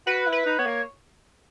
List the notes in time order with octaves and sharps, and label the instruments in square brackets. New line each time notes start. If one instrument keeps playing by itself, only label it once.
[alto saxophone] F#4 [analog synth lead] B4
[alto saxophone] E4
[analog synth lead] B4
[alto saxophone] D#4
[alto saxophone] B3 [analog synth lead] C#5
[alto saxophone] A#3